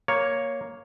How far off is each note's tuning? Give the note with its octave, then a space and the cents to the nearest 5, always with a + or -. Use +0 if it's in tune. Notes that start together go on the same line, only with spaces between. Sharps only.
A#3 +0 C#5 +0